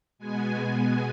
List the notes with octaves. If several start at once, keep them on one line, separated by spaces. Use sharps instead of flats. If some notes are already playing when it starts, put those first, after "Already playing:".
B2 G#3 B3 G#5